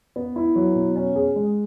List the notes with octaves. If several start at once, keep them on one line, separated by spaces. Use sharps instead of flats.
B3
E4
F#3
B2
C#4
G#4
G#3